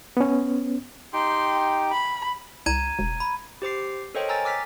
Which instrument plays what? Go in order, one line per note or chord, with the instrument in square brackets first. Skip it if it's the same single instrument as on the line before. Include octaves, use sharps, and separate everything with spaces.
[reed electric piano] B3 C#4
[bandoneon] D#4 G4 G5 [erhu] C6
[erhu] B5
[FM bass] C2 [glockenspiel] A#5 G#6 D#7
[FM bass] E1
[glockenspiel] B5
[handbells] G4 C5 D6 C7
A4 A#4 C5 C#5 D#5 G5
G#5 A#5 E6 A6
D6 E6 F6 A6 B6